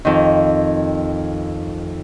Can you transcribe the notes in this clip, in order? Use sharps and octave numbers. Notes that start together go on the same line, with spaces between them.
F2 D#3